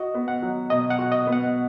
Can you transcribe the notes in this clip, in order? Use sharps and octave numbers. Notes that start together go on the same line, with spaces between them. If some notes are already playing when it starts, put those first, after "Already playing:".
Already playing: F#4 D#5
B3
F#5
F#3
B2 D#5
F#5
F#4
D#5
B3
F#5